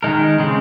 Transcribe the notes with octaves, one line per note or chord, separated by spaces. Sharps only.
D#3 G#3 D#4 A#4
C#3 G#3 C4